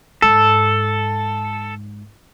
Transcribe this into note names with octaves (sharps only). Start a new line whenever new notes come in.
G#2 A4